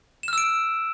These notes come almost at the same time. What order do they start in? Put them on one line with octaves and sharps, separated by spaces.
E7 F6 E6 D7